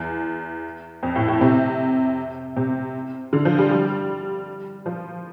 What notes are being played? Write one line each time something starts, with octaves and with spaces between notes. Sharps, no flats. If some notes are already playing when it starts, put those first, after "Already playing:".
Already playing: E2
F2
A2
A2
C3
C3
D3
F3
G3
G3
F3